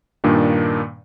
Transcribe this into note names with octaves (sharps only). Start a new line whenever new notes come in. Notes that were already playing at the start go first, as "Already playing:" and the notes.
G2 A#2 D#3 A#3 D4